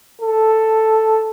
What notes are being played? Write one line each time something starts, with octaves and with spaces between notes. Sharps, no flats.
A4